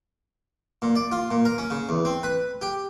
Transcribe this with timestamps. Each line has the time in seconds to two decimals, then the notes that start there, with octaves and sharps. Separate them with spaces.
0.82 A#2
0.95 D5
1.12 F4
1.31 A#2
1.45 A#4
1.58 C#4
1.70 C#3
1.89 E2
2.05 C4
2.23 B4
2.62 G4